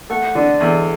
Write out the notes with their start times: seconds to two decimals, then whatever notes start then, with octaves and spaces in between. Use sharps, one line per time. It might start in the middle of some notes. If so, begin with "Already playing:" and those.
0.10 A3 F#5
0.35 D3 D5
0.60 E2 A4